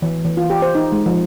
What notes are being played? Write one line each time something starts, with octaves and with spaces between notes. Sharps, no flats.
E3
E3
F4
G4
C5
D#4
G#3
F3